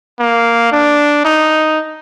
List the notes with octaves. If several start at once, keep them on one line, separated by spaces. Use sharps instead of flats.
A#3
D4
D#4